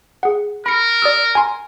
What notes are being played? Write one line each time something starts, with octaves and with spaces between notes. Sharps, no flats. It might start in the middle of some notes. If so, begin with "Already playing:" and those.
G#4 F#5
A#4 B5 C#7
D5 D#6 E6
G#5 A#5 C6